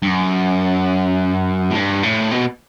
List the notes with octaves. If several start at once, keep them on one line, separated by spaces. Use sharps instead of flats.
G2
F#2
A2
G2
A2
B2